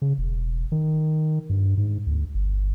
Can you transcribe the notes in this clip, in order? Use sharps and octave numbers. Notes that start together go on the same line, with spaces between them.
C#3
E1
D#3
G2
G#2
D2
G1